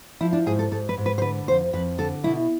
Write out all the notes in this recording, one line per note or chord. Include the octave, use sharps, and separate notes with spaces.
F3 E4
D4
G#2 G#4
A4
G#2 A4
B4
G#2
B4
C5
D3 B4
F2 C5
F2 B4
D3 A4
B2 E4